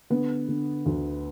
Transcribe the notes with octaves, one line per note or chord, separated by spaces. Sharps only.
D3 B3
D3
D2